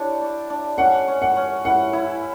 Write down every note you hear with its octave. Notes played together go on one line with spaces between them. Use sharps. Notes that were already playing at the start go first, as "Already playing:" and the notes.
Already playing: D4 E4 G4 C#5
D5
D4
C#4 F#5
C#4
F#5
C#4
E4 F#5
E4